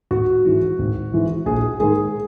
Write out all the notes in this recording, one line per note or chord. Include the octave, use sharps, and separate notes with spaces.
G#1 F#4
G#2 E3 G#3
G#1
G#2 E3 G#3
A#1 G#4
G#2 D#3 G#3 G#4